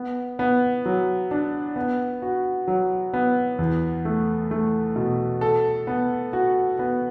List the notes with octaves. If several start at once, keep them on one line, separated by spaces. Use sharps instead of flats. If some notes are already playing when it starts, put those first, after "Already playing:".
Already playing: B3
B3
F#3
D4
B3
F#4
F#3
B3
E2
A3
A3
B2
A4
B3
F#4
B3